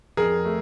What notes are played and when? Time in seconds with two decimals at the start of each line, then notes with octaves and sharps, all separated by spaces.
0.17 F2 G#4 A#4
0.45 A3